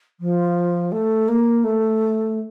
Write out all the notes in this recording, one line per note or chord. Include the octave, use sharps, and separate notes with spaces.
F3
A3
A#3
A3